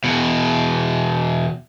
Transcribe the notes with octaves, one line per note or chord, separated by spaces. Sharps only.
E2 B2